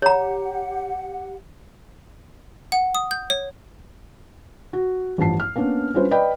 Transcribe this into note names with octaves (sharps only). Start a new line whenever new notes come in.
G4 C#5 F#5 A#5
F#5
D#6
G6
C#5
F#4
A1 G2 F3 A5 C7
F6
A#3 B3 C#4 D4
G3 C#4 D4 F4 B4 C5
B4 D5 D#5 G5 B5